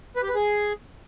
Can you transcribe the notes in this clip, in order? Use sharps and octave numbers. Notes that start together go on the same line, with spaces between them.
B4
G4
B4
G#4